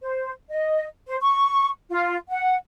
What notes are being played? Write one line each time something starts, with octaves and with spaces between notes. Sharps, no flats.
C5
D#5
C5
C#6
F4
F#5